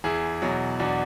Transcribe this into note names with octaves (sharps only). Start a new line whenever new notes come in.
E2 E4 G#4
B2 F#3
E2 D4 F#4